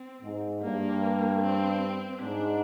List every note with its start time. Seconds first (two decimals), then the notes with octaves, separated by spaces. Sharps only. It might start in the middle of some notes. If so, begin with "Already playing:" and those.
Already playing: C4
0.22 G#2
0.62 G2 A#3
1.42 C4
2.22 G#2 D4